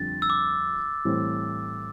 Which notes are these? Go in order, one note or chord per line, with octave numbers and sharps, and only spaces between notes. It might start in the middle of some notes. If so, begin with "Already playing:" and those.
Already playing: F2 D3 G3 C4 A6
E6
D6
A2 E3 G3 C4